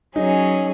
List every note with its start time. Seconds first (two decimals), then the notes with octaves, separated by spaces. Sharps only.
0.16 F#3 C#4 D#4 G#4